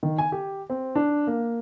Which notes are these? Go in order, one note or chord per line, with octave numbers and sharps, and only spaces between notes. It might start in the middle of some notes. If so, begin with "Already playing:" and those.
D#3
G#5
G4
C4
D4
A#3